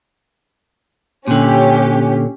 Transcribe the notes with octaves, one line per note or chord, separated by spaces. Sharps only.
A#2 D3 C#4 G4